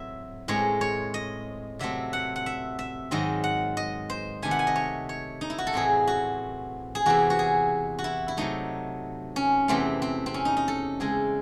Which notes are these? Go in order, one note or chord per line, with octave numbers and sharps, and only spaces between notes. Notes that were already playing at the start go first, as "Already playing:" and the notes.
Already playing: A2 F#3 C4 E5
A2 G#3 C4 C#5
C#5
D#5
C3 F#3 A3 C4 E5
F#5
F#5
E5
E5
G#2 D#3 F#3 C4 D#5
F#5
D#5
C5
C3 D#3 A3 G#5
F#5
G#5
D#5
C#5
C#5
D#4
E4
F#4
A4
A2 E3 C4 G#4
F#4
G#4
E2 C3 E3 C4 F#4
F#4
G#4
F#4
E4
E4
C3 F#3 A3 D#4
C#4
E2 C3 E3 A3 C4
C4
C4
C#4
D#4
D#4
A4
C#3 G#3 C4 G#4